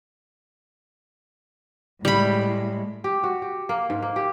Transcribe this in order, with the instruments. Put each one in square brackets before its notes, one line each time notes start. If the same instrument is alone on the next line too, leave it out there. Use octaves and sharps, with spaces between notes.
[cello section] A2 G#3 [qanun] G3 B5
[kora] G4
F#4
G4
A#3
G#2
A#3
G4